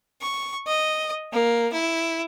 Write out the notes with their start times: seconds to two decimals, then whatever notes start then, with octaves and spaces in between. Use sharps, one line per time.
0.21 C#6
0.67 D#5
1.32 A#3
1.72 E4